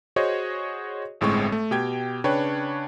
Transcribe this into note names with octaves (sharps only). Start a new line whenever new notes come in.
F#4 G#4 C5 C#5 D#5
G1 A2 G#3 C4 C#6
A3
B2 G4 G5 G#6
C#3 D4 B4 C#5 G5